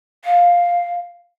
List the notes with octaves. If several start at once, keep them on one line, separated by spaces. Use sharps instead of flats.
F5